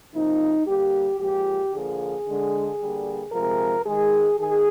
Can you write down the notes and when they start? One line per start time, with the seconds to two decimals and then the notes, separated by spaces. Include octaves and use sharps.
0.13 C3 F3 A#3 D#4
0.66 D3 G3 A#3 G4
1.20 A#2 F3 G#3 G4
1.72 D3 F3 A#3 G#4
2.27 D3 G#3
2.79 D3 G3 A#3
3.33 C3 F3 G#3 A#4
3.85 D#3 G#3 G#4
4.38 D#3 G#4